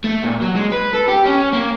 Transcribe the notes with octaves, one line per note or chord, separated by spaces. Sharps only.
A3
A#2
F#3
G#3
B4
A4
G4
C#4
A#3